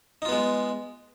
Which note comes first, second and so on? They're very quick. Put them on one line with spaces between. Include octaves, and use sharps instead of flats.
D#4 F4 B3 G#3